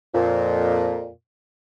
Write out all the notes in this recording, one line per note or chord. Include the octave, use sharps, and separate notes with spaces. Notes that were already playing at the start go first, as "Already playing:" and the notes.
F2 A#2